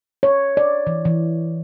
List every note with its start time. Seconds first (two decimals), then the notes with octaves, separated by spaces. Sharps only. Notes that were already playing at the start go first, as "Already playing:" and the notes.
0.23 C#5
0.57 D5
0.87 E3
1.05 E3